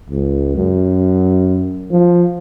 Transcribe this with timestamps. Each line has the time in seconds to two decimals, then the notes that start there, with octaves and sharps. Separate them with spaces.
0.10 C#2
0.56 F#2
1.91 F3